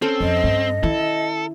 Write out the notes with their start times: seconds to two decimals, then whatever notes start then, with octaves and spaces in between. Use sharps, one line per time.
0.02 C4 C#4 A4
0.21 F2 D#5
0.44 G2
0.84 D#3 E4 A4